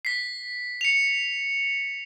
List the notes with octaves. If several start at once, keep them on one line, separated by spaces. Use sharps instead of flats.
B6 C7
C#7 F7